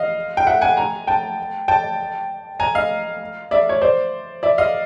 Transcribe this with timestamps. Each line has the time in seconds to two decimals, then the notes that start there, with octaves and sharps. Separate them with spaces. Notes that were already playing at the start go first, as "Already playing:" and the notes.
Already playing: D#5 F5
0.37 G5
0.47 E5 F#5
0.61 F#5 G#5
0.77 G#5 A#5
1.07 G5 A5
1.68 G5 A5
2.60 G#5 A#5
2.75 D#5 F5
3.51 D5 E5
3.69 C#5
3.81 C5 D5
4.43 D5 E5
4.58 D#5 F5